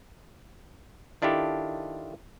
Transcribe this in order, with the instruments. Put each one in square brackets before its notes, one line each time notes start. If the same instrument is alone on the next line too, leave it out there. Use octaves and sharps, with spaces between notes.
[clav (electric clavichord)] D#3 D4 E4 F4 G4 A4